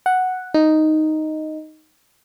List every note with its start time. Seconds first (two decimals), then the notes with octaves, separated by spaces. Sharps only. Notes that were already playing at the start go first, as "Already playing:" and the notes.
0.06 F#5
0.54 D#4